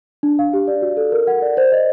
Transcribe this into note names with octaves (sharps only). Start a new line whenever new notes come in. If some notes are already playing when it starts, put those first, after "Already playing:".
D4
F5
G4
D5
F#4
A4
A#4
F#5
D5
C5
D#5